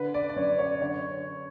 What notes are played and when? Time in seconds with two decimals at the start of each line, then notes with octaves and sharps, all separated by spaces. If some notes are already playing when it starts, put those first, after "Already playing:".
Already playing: D3 B4
0.14 D5
0.29 D5
0.36 F#2 C#5
0.59 C#5
0.81 D3 C#5